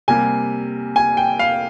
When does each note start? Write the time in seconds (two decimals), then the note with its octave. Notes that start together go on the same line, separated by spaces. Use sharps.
0.08 C3 G3 A#3 G#5
0.96 G#5
1.17 G5
1.39 F5